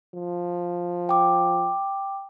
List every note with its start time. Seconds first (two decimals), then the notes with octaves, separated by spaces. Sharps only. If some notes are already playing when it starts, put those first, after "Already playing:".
0.15 F3
1.09 G5 D6